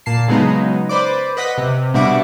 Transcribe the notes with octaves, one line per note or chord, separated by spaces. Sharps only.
A#2 A5 C7
C#3 F#3 G#3 B3 D#4
B4 C5 D5 D6
B4 D#5 F#5 B6
C3
B2 G3 D4 E5 F#5 D6